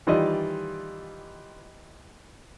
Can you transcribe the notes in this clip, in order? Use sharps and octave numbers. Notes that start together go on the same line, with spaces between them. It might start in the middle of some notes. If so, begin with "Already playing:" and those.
D#3 E3 G3 F4 D5 D#5